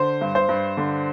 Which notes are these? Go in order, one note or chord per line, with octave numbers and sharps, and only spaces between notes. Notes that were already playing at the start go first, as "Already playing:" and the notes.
Already playing: D3 C5
G2
C5
G2
D3